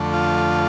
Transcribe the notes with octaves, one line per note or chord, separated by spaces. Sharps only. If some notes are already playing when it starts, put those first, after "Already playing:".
Already playing: F2 D3 A3
F4